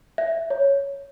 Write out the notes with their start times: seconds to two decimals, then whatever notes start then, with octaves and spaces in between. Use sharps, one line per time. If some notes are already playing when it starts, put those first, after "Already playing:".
0.18 E5
0.50 C#5